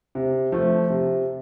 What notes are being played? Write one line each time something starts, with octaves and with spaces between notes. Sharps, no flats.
C3
F3 A3
C3